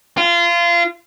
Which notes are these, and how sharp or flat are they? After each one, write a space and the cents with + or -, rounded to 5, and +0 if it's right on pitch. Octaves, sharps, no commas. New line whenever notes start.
F4 -25